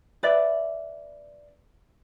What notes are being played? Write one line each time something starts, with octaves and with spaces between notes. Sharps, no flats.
B4 D5 E5